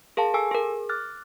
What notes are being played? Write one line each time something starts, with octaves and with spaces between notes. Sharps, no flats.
G#4 A#4 F5 A5
A4 G#5 E6
G#4 A#4
D6 F6 F#6 A6